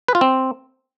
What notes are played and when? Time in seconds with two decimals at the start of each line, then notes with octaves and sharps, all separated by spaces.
0.08 B4
0.15 F4
0.21 C4